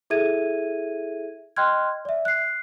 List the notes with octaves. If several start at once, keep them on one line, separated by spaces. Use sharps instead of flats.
E4 G#4 A4 E5 G#6 D#7
D#5 G5 C6 F6 F#6 G#6
D5 E5
F#6 C7